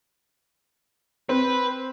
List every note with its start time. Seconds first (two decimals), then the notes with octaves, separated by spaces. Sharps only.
1.29 C4 B4